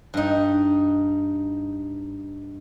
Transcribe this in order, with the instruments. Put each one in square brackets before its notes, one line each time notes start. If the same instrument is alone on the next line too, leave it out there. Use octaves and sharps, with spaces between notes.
[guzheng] G2 D#4